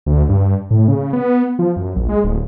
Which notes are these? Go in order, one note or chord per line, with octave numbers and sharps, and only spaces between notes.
D2
G2
A2
C#3
B3
F3
F#2
A#1
G#3
D1